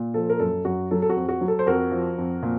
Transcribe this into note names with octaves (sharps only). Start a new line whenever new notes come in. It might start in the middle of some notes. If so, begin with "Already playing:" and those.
Already playing: A#2
F3 A4
A#4
F#2 A4
F#2 F#4
F#3 A4
A4
F#4
F2
F#4
F#3
A4
C5
F2 F#4 A#4
F3
F2
A#2